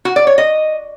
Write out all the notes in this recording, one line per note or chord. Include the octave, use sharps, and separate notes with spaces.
F#4
D5
C#5
D#5